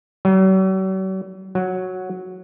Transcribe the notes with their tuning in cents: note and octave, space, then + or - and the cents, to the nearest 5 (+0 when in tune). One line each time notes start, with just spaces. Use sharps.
F#3 +45
F#3 -5